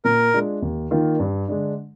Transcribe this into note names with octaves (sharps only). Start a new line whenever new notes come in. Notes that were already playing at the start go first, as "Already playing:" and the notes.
A#2 A#4
G#3 D4 F4
D#2
D#3 A#3 F4
G2
D3 G#3 D4